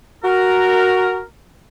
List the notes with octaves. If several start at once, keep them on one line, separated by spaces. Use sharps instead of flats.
F#4 A#4